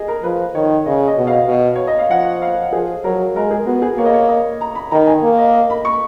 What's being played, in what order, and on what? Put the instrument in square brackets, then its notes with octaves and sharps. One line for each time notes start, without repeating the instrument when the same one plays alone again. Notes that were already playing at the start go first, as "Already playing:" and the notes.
Already playing: [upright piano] G#4 D#5
A#4
[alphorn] F3 [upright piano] B4
[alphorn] D#3 [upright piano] C#5
[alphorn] C#3 [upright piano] D#5
[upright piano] D#5
[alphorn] B2
[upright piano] F5
[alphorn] B2
[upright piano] C#5
D#5
F5
[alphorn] F3 [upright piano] F#5
[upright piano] F5
[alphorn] F3 [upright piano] G#4
[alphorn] F#3 [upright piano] A#4
[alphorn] G#3 [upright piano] A#4
[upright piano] G#4
[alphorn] B3 [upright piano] F#4
[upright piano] G#4
[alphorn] A#3 [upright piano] C#5
[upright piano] D#5
C#5
D#5
A#5
B5
[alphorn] D#3 [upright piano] A#5
[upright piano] G#5
[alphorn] A#3
[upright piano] D#5
D#5
B5
C#6